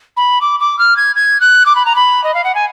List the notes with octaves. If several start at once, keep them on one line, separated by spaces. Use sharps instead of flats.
B5
D6
D6
F6
G#6
G#6
F#6
D6
B5
A#5
B5
D#5
F5
F#5
G#5